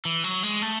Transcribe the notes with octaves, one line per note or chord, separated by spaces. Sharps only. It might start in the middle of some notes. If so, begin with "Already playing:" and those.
E3
F#3
G#3
A3